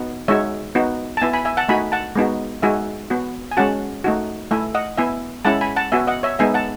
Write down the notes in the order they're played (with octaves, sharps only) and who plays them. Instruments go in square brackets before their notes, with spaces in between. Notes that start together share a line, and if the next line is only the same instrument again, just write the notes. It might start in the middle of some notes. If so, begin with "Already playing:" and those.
Already playing: [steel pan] B3 D#4 F#4
G#3 D#4 F#4 C#5 E5
B3 D#4 F#4
A5
B3 E4 E5 G#5
G#5 B5
E5 G#5
F#5 A5
A3 D#4 F#4 G#5 B5
F#5 A5
G#3 B3 D#4 F#4
G#3 D#4 F#4 E5 G#5
B3 F#4
G#5
G#3 C#4 F#4 F#5 A5
A3 D#4 F#4
A3 E4 E5 G#5
D#5 F#5
B3 E4 E5 G#5
G#3 C#4 E4 F#5 A5
G#5 B5
F#5 A5
B3 F#4 E5 G#5
D#5 F#5
C#5 E5
G#3 B3 D#4 E5 G#5
F#5 A5